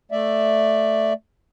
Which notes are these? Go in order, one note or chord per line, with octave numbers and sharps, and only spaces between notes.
A3 D5 E5